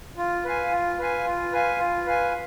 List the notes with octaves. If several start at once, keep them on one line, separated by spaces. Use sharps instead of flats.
F4
B4 F5 G#5
F4
B4 F5 G#5
F4
B4 F5 G#5
F4
B4 F5 G#5